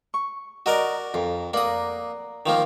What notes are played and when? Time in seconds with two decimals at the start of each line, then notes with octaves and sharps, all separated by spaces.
0.14 C#6
0.66 F#4 A#4 D5 D#5 A#5
1.14 F2 A#4
1.54 A#3 D5 F#5 A#5 D#6
2.46 D#3 F3 A#3